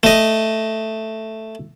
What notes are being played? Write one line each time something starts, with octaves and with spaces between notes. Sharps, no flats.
A3 D#5